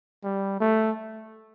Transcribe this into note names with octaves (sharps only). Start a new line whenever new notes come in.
G3
A3